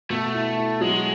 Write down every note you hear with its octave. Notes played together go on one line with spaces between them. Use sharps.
B2 A3
E4
E4
F#3 G#3